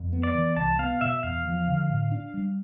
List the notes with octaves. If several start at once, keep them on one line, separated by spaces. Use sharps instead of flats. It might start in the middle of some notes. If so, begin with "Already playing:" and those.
Already playing: F2
B3
D5
E3
C2 A5
B3 F5
B2 E5
E2 F5
F3
D3
A2
D4
G3